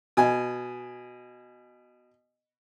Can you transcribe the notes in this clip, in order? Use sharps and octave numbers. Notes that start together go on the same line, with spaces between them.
B2 G#5